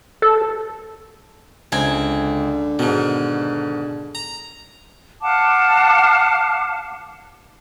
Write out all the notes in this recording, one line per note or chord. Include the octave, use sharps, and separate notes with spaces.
A4
C#2 D3 C4 G#5
G#2 B2 D#3
A#5
F5 F#5 A5 D6